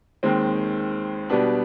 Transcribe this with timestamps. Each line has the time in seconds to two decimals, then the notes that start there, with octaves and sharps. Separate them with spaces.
0.23 D#2 D#3 G#3 C4
1.29 B2 G3 B3 D4